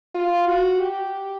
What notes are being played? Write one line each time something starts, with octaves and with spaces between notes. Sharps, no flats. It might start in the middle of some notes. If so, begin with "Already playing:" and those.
F4
F#4
G4